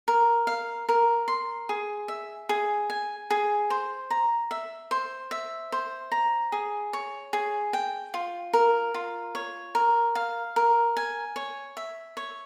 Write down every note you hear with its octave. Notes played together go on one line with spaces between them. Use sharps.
A#4
F5
A#4
C6
G#4
E5
G#4
G#5
G#4
C5
A#5
E5
C5
E5
C5
A#5
G#4
C#5
G#4
G5
F4
A#4
F4
C#5
A#4
F5
A#4
G#5
C#5
E5
C#5